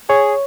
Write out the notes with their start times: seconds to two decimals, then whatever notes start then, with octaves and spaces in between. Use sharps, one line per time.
0.09 G#4 C#5